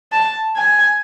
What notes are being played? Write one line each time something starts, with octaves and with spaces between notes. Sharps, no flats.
A5
G#5